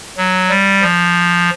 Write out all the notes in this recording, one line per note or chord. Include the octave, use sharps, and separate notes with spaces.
F#3
G3
F3